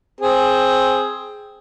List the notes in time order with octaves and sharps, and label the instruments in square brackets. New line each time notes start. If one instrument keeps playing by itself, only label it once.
[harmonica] C4 G#4